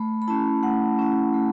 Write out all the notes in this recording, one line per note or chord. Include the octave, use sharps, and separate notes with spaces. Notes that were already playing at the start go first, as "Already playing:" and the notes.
Already playing: A3 B5
B5
C#4 E4 A5
A3 F#5
C#4 E4
A3